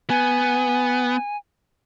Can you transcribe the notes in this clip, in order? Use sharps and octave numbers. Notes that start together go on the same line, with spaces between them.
B3 G#5